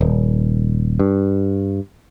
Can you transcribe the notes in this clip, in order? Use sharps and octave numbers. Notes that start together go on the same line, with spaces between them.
D#1
G2